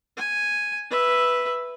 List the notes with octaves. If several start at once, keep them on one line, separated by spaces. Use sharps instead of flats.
G#5
B4 E5